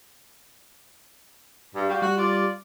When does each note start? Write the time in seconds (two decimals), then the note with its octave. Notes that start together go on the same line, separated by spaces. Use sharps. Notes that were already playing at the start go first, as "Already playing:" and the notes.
1.75 G2
1.89 G3 F#4 G4 F5
2.02 G3 F#4
2.18 F4 D5